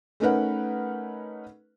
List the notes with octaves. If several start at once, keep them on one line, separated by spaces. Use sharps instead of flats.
A3 C#4 D#4 A#4 B4 F#5